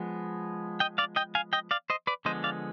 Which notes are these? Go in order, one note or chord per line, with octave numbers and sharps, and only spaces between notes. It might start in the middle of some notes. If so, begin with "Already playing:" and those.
Already playing: F3 G#3 B3
D#5 G5
D5 F5
D#5 G5
F5 G#5
D#5 G5
D5 F5
C5 D#5
B4 D5
D3 F3 G#3 B3 C5 D#5
D5 F5